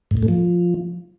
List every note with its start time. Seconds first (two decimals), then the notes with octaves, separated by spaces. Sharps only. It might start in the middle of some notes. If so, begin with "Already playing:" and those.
0.11 G#2
0.17 A2
0.23 A3
0.28 F3